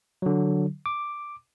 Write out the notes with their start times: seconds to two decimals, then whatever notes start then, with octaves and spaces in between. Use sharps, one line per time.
0.22 D3 F#3
0.86 D6